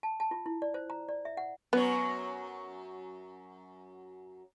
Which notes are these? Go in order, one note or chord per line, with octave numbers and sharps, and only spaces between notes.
A5
A5
F4
E4
D5
C5
A#5
D5
E5
F#5
F#2 F#3 B3 C#5